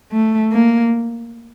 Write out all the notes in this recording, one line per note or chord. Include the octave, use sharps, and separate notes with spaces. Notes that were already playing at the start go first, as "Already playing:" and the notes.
A3
A#3